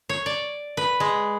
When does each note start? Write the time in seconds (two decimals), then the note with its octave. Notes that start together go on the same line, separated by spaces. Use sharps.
0.09 C#5
0.26 D5
0.77 B4
1.00 G#3